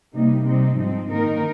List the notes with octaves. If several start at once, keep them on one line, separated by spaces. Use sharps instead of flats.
C3 G3 A#3 D#4
C3 G3 C4 D#4
G#2 F3 C4 D#4
D#3 A#3 D#4 A#4